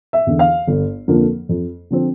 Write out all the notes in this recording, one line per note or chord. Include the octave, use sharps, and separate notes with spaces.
E5
E2 D3
F5
G1
F2 D3 F3 A#3
F2
D3 F3 C4